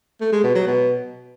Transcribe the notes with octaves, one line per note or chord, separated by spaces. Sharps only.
A3
G#3
B2
F#3
B2